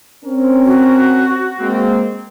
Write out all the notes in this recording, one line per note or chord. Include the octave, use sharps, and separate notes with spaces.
C4 C#4 A#4
F#4
G#3 A#3 C4